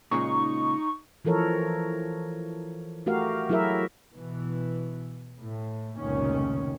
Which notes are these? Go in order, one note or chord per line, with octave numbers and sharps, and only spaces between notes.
A#2 C#3 G#3 D#4 C#6
E3 F3 A4 A#4 C#5
A3 F#4 G4 A#4 F5
F#3 E4 F#4 G#4 A#4 E5
B2 E3
A2
F1 C#2 A#2 D#3 C#4